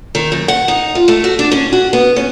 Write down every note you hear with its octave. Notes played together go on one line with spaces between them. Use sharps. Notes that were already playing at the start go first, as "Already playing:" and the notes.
D#3
F#2
F#5
D#4
F4
A3
F#4
D4
C#4
F#4
B3
C#4